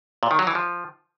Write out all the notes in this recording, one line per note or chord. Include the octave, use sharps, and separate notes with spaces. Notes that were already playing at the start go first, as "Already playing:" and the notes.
A#2
D#3
F#3
E3
F3